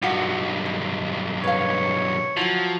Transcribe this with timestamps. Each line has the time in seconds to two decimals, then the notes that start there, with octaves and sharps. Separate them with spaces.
0.02 B1 G2 F4 F#4
0.66 D#3
1.44 B4 C#5 F5
2.37 F3 F#3 E4 F#4